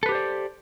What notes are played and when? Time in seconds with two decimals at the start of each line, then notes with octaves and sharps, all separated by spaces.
0.03 A4
0.06 B4
0.09 G4
0.12 C5
0.15 D5